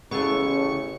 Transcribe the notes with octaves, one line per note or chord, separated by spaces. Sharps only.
A1 C#3 B3 E4 A4 C#6